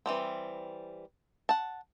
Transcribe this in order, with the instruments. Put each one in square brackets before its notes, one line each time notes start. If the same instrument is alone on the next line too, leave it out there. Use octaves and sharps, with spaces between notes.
[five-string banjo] E3 G3 C4
F#5 A5